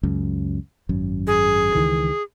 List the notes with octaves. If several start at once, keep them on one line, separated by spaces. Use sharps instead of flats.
C#2 F#2
G#1 F#2
G#4
C#2 D#3 E3